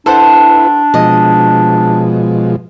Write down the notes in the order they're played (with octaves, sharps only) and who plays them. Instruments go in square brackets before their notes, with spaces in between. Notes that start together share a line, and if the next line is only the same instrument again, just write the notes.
[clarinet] D4 [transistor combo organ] E4 B4 [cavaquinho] A4 C5 F#5
[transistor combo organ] B2 F3 G#3 [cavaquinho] D#5